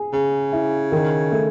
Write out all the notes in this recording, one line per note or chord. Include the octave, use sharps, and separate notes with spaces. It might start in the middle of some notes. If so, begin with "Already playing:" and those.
Already playing: G#4
C#3 G#4
E4
D#3
A3